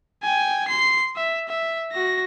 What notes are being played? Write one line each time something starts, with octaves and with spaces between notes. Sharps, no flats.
G5 G#5
C6 C7
E5
E5
F#4 A#6